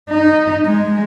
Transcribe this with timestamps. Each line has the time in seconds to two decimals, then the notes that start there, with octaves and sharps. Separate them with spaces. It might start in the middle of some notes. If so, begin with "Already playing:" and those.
0.10 D#4
0.66 G#3